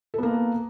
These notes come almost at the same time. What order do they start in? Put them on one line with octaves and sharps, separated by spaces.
A4 B3 A#3